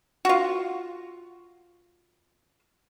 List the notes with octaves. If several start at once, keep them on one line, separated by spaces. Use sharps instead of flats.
F4 F#4